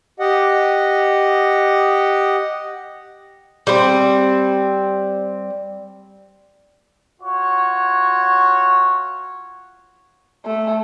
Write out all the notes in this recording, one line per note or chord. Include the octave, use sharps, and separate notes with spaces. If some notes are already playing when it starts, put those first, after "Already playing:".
G4 D#5 F#5
G3 C4
F4 F#4 C#5
A3